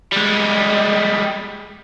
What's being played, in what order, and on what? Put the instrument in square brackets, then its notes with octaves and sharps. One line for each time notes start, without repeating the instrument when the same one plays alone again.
[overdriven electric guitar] G3 G#3